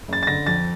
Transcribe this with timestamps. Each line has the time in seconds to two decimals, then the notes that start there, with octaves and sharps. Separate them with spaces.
0.08 F#1 A6
0.23 A6
0.27 D3 A#6
0.46 F2 A6